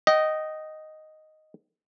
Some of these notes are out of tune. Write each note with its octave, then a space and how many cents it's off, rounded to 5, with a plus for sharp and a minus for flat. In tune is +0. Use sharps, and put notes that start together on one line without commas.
D#5 +0 G5 -30